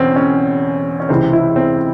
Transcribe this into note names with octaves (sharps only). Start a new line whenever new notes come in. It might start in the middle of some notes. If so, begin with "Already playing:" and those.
Already playing: E1 E2 C#3 C4 C#4
C#4
C#4
C#2 C3 E3 C4
E4
C4